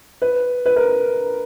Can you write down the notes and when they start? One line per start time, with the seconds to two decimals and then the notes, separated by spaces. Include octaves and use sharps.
0.22 B4
0.66 B4
0.76 A#4